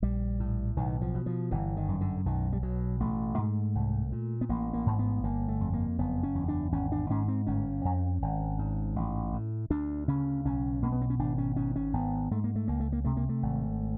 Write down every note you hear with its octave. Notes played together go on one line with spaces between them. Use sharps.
A#1 G3
A2
B1 D#3
F3
B2
F3
G1 E3
D#3
F#2
D3
B1 D#3
G3
B2 F#3
A1 A3
G#2
C2
A#2
B3
A1 A#3
A#3
G#2
B3
G1 A#3
A3
F2
A#3
F#1 B3
C#4
E2
D4
G#1 C#4
D4
G#2 C#4
C4
G1 C#4
F2
G#1
G#2
A1
A2
D2 D4
C#3 C#4
B1 C#4
B2 A#3
B3
C4
C#4
G#1 D4
C#4
G#2 C#4
C#4
G#1 B3
G#2 A3
A#3
A3
C#2 A#3
A3
A#3
C3 A3
A#3
A3
G#1